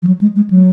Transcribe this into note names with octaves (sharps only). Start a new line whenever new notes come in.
F3
F#3
G#3
G#3
F#3